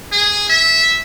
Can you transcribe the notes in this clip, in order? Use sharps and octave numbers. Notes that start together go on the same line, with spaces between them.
G#4
E5